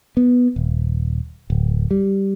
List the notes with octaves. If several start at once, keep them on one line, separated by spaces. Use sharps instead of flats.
B3
D#1
D1
G3